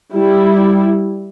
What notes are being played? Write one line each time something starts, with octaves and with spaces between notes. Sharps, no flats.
G3 E4